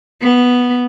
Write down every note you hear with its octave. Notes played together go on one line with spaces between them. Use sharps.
B3